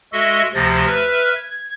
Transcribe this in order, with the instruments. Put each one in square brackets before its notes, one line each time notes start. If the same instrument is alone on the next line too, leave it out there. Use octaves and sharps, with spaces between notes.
[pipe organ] G#3 F#4 A4 D#5 E5
D2 C3 F3 A6 A#6
B4 E5 F6
G#6